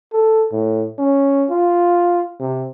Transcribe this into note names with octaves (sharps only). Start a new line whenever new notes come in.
A4
A2
C#4
F4
C3